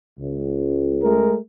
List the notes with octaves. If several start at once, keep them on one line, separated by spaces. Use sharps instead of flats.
C#2
G#3 A3 A#4